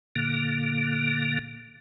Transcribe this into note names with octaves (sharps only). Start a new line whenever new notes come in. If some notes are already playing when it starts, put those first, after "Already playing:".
A#2 D3 A#3